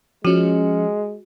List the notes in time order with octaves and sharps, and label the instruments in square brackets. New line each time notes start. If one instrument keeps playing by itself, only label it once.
[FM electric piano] F3 C#4 [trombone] G#3 [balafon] F#4